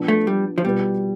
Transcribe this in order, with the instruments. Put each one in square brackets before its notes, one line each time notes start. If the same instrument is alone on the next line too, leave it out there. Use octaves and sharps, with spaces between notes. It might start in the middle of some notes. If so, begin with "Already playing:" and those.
Already playing: [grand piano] F3 B3 D4
[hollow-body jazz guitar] A3
G3
F3
[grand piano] B2 B3 F4 B4 [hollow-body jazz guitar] G3